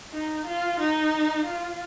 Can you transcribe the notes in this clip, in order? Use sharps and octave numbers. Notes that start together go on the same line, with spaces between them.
D#4
F4
D#4
F4